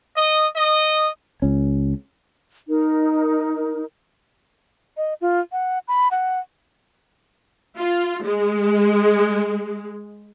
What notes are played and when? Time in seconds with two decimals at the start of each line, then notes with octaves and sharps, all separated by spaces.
0.16 D#5
0.55 D#5
1.42 C#2 C#4
2.69 D#4 A#4
4.97 D#5
5.21 F4
5.52 F#5
5.88 B5
6.11 F#5
7.78 F4
8.24 G#3